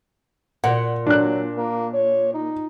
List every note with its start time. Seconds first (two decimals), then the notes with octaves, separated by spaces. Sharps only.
0.64 A#2 F#5
1.07 F#3 D4 F#6
1.58 A#3
1.94 C#5
2.34 D#4